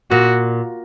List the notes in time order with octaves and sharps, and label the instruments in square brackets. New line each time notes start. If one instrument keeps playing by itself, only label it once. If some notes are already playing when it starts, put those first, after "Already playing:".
[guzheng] A#2 [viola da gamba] F#4